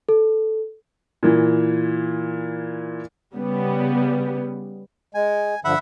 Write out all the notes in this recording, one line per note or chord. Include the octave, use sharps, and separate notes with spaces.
A4
A#2 E3
C#3 G3 B3
G#3 G#5
G2 D3 F3 E5 F#5 B5